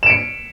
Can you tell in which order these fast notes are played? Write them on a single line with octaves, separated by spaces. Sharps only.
E7 D7 C#7